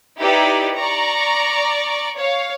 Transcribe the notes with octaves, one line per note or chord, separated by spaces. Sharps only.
D#4 E4 G4 B4 D5
D5 A#5 C#6
C#5 F5